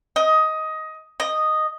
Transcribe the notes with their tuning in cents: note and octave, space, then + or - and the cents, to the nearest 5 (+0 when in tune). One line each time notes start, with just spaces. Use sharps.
D#5 +15
D#5 -5